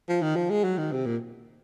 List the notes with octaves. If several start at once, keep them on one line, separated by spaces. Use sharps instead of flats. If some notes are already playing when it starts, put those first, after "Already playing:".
F3
D#3
F3
G#3
F#3
D#3
C3
A#2